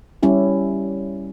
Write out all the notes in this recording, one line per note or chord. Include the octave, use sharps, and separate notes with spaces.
G3 C#4 E4 G4